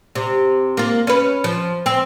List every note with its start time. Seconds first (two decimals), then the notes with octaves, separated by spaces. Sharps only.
0.15 C3
0.77 A#3 F4
1.07 C#4 B4
1.44 F3
1.86 C4